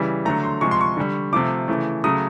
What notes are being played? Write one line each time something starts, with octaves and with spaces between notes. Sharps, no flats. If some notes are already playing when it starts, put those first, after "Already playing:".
Already playing: C#3 E3 G3
D3 F#3 A3 A#5
C6
C3 F3 G#3 C#6
C6
C#6
D3 G3
C3 F3 A3 D6
C#3 E3 A3
C#3 F#3 A3 D#6